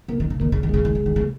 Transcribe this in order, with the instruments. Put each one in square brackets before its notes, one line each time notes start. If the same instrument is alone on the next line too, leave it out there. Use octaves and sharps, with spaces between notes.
[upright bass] C#3 [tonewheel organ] A#3
[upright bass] D#3
C#3
[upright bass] D#3 [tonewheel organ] A#3
[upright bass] C#3
D#3
[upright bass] C#3 [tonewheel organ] G#3
[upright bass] D#3
C#3
D#3
C#3